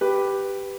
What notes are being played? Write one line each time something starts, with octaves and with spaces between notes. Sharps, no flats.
G4 B4